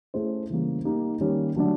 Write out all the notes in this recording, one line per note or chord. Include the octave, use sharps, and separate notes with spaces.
A3 C#4 E4 G#4 C5
C#3 E3 G3 A#3
A#3 D#4 G4
D#3 G3 A#3 C#4
D3 F#3 A3 D4